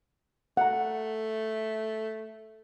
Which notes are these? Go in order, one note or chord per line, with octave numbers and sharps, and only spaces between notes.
A3 F#5 A#5